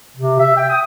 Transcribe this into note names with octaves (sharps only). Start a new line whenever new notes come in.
C3
E5
G5
D#6